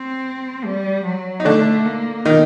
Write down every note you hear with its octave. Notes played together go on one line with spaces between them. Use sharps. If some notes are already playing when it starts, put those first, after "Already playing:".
Already playing: C4
G3
F#3
D#4
D3 A3 D4
A#3
D#3 D#4